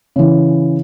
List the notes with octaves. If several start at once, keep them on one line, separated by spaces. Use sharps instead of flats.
C#3 E3